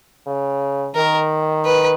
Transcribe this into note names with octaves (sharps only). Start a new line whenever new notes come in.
C#3
D#3 A#4
B4